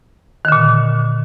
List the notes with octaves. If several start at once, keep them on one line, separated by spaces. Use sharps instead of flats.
A#2 D3 D#3